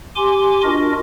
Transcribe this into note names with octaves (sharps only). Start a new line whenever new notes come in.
G4 G#5 C6 D6
D4 F4 F#4 A#4 D#5